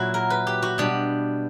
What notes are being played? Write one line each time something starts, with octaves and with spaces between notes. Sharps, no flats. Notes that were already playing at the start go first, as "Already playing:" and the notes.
Already playing: A#2 F#3 E4 F#4
A#4
B4
G4
F#4
B2 G3 D4